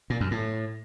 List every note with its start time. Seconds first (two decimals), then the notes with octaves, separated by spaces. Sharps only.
0.10 A#2
0.21 F#2
0.31 A2